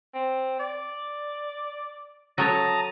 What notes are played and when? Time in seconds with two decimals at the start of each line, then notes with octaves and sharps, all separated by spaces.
0.15 C4
0.59 D5
2.38 F#3 A4 C#5 A5 A#5 D#6